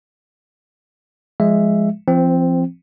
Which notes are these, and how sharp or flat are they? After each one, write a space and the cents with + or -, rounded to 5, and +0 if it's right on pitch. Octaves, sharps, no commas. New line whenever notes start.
F3 +0 G#3 +0 E5 +10
F3 -30 C4 +0